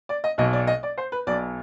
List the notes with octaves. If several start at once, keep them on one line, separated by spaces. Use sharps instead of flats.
D5
D#5
B1 B2 D#5
D5
D#5
D5
C5
B4
B1 B2 D5